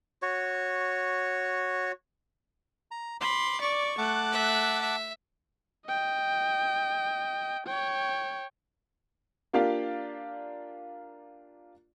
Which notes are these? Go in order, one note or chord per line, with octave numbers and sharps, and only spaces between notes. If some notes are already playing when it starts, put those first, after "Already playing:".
F#4 C#5
A#5
B5 C6 D6
D5 C#6
A3 F#5 A5 D6 F#6
E5
E5
D#5 G5
C#5 G5
A#3 D4 F4 G4 D5 F5